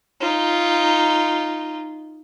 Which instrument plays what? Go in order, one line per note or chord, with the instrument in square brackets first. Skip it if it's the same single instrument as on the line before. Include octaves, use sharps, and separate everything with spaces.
[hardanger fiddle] D#4 F4